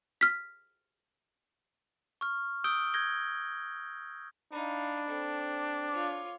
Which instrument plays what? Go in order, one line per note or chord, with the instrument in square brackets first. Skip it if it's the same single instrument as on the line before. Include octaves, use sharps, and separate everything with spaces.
[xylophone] F6 B6
[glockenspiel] C#6 F6
D#6 E6 G6 D7 G7
G6 G#6 A#6 G7
[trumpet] D4 [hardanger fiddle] D#4 F5 [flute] B5
[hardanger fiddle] C4 A4
[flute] D6
[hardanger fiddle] F4 C#5